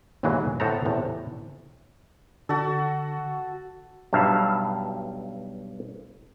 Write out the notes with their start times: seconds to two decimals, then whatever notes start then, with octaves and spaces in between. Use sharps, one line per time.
0.23 G1 D#2 A#2 E3 F#3 G#3
0.60 A2 B3 A4 C5 A#5
0.85 E2 A2 C3
2.49 D3 F#4 A4
4.13 B1 G2 B2 E5 F5